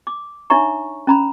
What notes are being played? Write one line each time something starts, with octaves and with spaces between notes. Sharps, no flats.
D6
D4 D#4 C#5 E5 A#5 C#6
C#4 A#5 B5